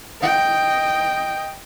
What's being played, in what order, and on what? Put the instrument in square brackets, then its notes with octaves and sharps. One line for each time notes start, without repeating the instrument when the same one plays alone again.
[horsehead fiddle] D#5 G5